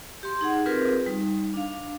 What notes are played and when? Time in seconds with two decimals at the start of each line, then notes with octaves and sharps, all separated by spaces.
0.23 G4 C6
0.41 D#4 G#4 F#5
0.66 C4 F4 G4 G#4 A#4 B4
1.06 G3 D#4
1.54 D4 F5